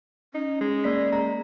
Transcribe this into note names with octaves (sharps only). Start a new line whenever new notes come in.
C#4 D#4
G#3
A#3 D5 B6
G#3 A#5